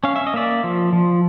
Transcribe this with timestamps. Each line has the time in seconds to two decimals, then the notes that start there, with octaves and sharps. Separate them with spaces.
0.04 C#4 F5
0.16 E5
0.27 D#5
0.34 A#3 D5 E5
0.64 F3
0.93 F3